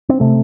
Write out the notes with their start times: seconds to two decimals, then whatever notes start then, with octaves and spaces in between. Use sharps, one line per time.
0.09 C4
0.20 C3 A3